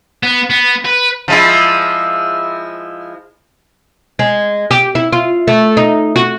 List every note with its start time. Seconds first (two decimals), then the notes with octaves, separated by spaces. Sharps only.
0.23 B3
0.50 B3
0.85 B4
1.28 F3 G#3 E4
4.19 G#3
4.71 G4
4.95 E4
5.12 F4
5.47 A3
5.77 D#4
6.16 F#4